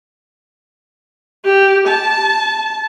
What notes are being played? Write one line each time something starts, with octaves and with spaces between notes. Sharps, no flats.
G4
A5